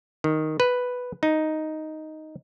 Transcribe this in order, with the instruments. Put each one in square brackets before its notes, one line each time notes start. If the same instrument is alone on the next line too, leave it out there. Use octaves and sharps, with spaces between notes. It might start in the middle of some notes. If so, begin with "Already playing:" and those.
[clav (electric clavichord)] D#3
B4
D#4